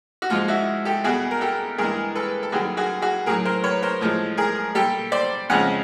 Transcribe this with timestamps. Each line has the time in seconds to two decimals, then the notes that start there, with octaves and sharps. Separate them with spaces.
0.22 F#4
0.30 G#2 F3 G#3 F4
0.48 E4 F#4
0.85 G4 A4
1.04 E2 B2 G3 F#4 G#4
1.31 A#4
1.41 G4 A4
1.78 G2 E3 G#3 G#4 A#4
2.15 A4 B4
2.43 A4
2.52 F#2 D#3 G3 F#4 G#4
2.77 F#4 G#4
3.02 F#4 G#4
3.26 A2 F#3 G#4 A#4
3.45 A#4 C5
3.64 B4 C#5
3.82 A#4 C5
4.01 A2 F3 G#3
4.37 G#4 A#4
4.75 A#2 G3 G4 A4
5.12 C5 D5
5.50 F2 C#3 F3 G#3 F#5 G#5